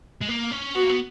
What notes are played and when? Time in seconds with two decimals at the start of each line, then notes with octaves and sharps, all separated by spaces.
0.21 G#3
0.28 A#3
0.51 C#4
0.75 B3 F#4
0.82 A#3
0.89 B3